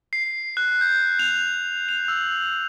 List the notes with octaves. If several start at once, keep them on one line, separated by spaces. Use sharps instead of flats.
C7
F#6
G6
F7
F7
E6